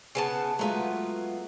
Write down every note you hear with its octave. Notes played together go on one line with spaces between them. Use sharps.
C#3 B3 A5
F#3 G#3 A3 B3 F4